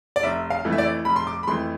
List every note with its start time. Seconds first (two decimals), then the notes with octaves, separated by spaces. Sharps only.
0.16 D5
0.23 F1 E5
0.50 F5
0.64 F2 E3 A3
0.72 E5
0.78 D5
1.05 F1 B5
1.16 C6
1.27 D6
1.43 B5
1.47 F2 E3 A3 C6